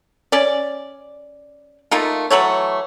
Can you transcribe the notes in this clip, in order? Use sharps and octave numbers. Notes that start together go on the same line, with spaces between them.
C#4 D5
A3 A#3 D#4 F4
E3 F#3 A3 C#5